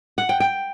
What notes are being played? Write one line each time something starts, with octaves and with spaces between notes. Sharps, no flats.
F#5
G5
G5